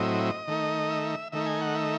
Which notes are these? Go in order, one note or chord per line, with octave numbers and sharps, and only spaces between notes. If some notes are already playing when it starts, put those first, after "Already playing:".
Already playing: A2 F#3 C4 E4 D#5
D#3 A3 D#4
E5
D#3 A3 D#4 E5
G#5
F#5
E5